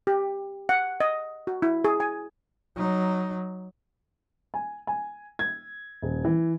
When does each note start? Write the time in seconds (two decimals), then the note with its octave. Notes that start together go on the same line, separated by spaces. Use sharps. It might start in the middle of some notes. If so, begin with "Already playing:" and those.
0.07 G4
0.69 F#5
1.00 D#5
1.47 F#4
1.62 E4
1.84 G#4
2.00 G#5
2.76 F#3 D#4
4.54 G#5
4.87 G#5
5.39 G#6
6.02 D#1
6.25 E3